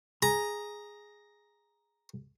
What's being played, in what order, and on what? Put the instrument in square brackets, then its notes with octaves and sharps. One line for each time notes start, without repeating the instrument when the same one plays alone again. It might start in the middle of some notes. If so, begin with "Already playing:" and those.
[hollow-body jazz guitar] G#4 [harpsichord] A#5